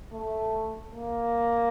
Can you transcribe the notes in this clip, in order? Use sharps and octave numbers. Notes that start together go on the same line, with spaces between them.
A3
A#3